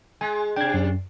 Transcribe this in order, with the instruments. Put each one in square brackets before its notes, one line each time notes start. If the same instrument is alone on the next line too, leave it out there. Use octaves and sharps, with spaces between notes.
[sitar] G#3 [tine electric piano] G#5
[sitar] C3 D4 [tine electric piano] G5 G#6
[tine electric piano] F#2